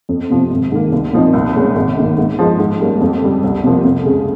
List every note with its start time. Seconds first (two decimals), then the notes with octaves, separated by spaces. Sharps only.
0.09 F2
0.30 C3 F3
0.50 G#1
0.72 G#2 D#3 A#3
0.92 C2
1.13 A#2 F3 C4 D#4
1.34 C2
1.56 A#2 G#3 C#4
1.76 G#1
1.97 G#2 D#3 A#3
2.17 G#2
2.39 F3 G#3 D#4
2.59 G#2
2.80 G3 A#3 C#4
3.01 F2
3.22 C#3 G3
3.44 C2
3.64 C3 F3 A#3
3.85 F2
4.06 C#3 G#3